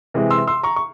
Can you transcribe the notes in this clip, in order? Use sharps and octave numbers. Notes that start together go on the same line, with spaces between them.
C3 E3 G#3
C6 E6
C6 E6
A#5 C#6
C#6